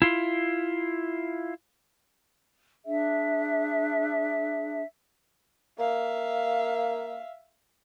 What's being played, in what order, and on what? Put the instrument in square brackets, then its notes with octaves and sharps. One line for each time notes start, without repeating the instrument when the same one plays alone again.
[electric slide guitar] E4 F4
[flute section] D4 G#4 E5
[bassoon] A#3 [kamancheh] E5 F5